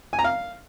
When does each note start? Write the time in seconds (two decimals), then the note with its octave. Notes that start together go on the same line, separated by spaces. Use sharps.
0.13 G#5
0.19 A#5
0.24 F5